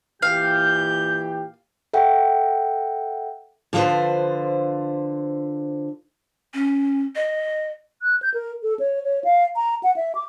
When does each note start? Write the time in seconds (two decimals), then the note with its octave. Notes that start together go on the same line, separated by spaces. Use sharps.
0.22 A#2 E3 G4 F5 G6
1.93 A4 E5 F#5 G5
3.73 D3 F3 F4 F#4 B4 C5
6.54 C#4
7.16 D#5
8.02 F#6
8.23 G6
8.34 A#4
8.63 A4
8.79 C#5
9.04 C#5
9.24 F5
9.56 A#5
9.83 F#5
9.96 E5
10.15 D6